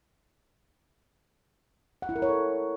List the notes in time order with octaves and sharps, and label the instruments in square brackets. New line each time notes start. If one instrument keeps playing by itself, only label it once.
[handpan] F#5
E4
A#4
C#5
A4